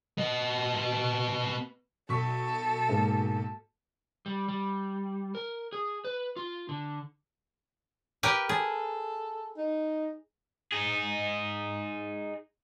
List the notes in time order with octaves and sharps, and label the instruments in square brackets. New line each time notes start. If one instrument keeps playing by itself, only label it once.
[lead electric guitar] B3 D#5
[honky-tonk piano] B1 C#6 B6 [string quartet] A4
[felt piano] G#2 G#3 A#3
[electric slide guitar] G3
G3
A#4
G#4
B4
F4
D3
[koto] G4 A#4 B4
[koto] G#4 [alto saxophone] A4
[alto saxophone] D#4
[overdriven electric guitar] D#4 G#4